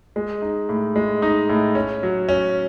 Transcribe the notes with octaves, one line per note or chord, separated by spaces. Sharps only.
G#3
D#4
A2
G#3
D#4
A2
C#4
F#3
C#4